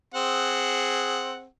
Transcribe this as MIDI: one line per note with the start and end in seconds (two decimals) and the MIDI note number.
0.14 1.46 60
0.14 1.46 68
0.14 1.46 78